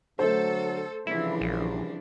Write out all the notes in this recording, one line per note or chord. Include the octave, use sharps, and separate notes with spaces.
D3 F#3 A3 A4 C5
C2 C#3 E3 F3 D4 E4
A#1